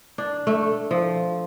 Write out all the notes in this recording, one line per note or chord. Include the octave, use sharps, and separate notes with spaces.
D4
A3
F3